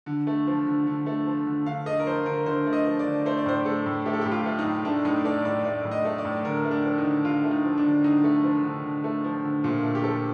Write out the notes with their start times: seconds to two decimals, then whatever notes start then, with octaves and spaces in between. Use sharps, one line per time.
0.06 D3
0.27 A3
0.47 F3
0.67 D3
0.87 D3
1.06 A3
1.27 F3
1.46 D3
1.66 D3 F5
1.86 A3 D#5
2.00 A#4
2.06 F3 C5
2.26 D3 A#4
2.46 D3 C5
2.66 A3
2.73 D#5
2.86 F3
2.99 D5
3.06 D3
3.26 A3 C5
3.37 D5
3.46 A2 C5
3.65 A3 A4
3.86 A2
4.06 A3 G4
4.13 A4
4.21 G4
4.25 A2
4.32 F4
4.46 A3
4.59 D#4
4.65 A2
4.85 A3 D4
5.05 A2 D#4
5.25 A3 D5
5.45 A2 D5
5.64 A3 D5
5.85 A2
5.91 D#5
6.05 A3
6.18 D5
6.25 A2
6.45 D3 A#4
6.64 A3
6.71 D4
6.85 F3
6.98 D#4
7.04 D3
7.25 D3 F4
7.44 A3
7.51 D#4
7.64 F3
7.77 D4
7.84 D3
8.04 D3 D#4
8.24 A3
8.44 F3
8.64 D3
8.84 D3
9.04 A3
9.24 F3
9.44 D3
9.64 A#2 F4
9.83 A3
9.95 G4
10.03 F3 A4